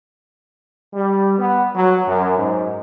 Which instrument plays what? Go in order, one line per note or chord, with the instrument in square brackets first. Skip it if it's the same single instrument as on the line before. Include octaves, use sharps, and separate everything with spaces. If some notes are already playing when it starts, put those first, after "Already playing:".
[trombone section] G3
B3
F#3
F#2
G#2